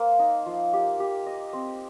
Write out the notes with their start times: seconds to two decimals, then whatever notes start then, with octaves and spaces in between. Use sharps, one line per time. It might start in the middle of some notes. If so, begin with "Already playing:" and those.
Already playing: A#3 C5
0.19 D#4
0.46 F3
0.73 G4
1.00 G4
1.26 D#5
1.53 C4